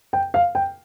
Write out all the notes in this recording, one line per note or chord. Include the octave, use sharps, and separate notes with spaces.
G5
F5
G5